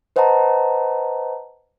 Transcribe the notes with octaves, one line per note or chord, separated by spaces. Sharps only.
B4 C5 D#5 F#5 A5 A#5